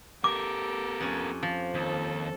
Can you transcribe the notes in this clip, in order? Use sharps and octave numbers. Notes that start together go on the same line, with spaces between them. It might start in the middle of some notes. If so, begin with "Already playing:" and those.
B3 G4 A4 A#4 D6
F2 C#4
F3
D#2 A4